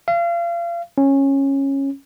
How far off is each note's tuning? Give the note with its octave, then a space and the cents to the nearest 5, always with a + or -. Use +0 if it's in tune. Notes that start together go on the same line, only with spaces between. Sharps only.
F5 -35
C#4 -15